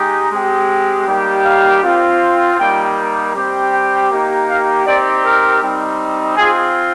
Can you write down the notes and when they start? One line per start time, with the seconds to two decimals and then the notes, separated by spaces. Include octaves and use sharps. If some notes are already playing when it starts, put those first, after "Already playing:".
Already playing: G#3 D#4 G4
0.30 G#3 C4 G4
1.07 G3 A#3 D#4 G4
1.44 F5
1.82 C4 F4
2.58 G3 A#3 D#4 G4 G5
3.34 G3 C4 G4
3.72 G5
4.09 A#3 D#4 G4
4.47 F5
4.85 C4 D#4 G4 D5
5.24 A#4
5.61 G3 C4 D#4
6.36 C4 F4 G#4